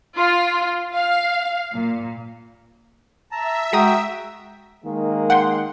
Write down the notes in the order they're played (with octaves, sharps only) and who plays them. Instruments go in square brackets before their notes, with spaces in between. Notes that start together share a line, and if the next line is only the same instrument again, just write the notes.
[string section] F4
F5
A#2
[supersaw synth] E5 [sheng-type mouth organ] A5 A#5
[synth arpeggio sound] G#3 A#5 D#6 [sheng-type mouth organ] F#4 G5
[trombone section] D#3 G#3 A#3
[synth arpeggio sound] F#5 G5 C6